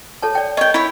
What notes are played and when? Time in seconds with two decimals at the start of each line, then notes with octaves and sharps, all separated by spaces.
0.23 A4 C#5 A5
0.35 D5 G5
0.57 C#5 D#5 G5
0.74 E4 C#5